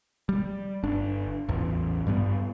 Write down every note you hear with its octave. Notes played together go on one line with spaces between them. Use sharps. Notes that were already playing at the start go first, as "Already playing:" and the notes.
G3
G1 D4
A1 E2
G2 G3 B3